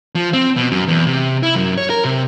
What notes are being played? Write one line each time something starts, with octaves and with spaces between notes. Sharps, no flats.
F3
C4
B2
F#2
E2
C3
E4
F#2
C#5
A#4
C3